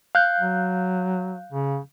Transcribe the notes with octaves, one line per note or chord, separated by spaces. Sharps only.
F5 F#6 G6
F#3
C#3